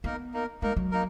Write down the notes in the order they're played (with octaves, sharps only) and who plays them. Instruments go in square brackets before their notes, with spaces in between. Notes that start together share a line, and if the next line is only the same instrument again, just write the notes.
[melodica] A#3 D#4 A#4 [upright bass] B3
[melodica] A#3 D#4 A#4
[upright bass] G#3 [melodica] A#3 D#4 A#4
[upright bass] F#3
[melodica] A#3 D#4 A#4